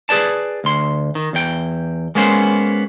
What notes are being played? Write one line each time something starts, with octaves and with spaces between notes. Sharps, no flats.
G#4 B4 D5 A5
D2 C6
D#3
E2 G5
G#3 A#3 B3 C#4 C5